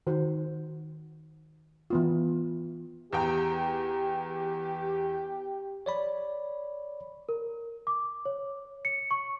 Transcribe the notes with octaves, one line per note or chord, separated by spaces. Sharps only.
D#3 F#4 C5
E3 B3 F4
E2 G4 G5 A#5
C#5 D5 B5
A#4
D6
C#5
C#7
C#6